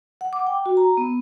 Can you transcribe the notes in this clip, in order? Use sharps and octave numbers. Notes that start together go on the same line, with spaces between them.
F#5
D6
G5
F#4
A#5
B3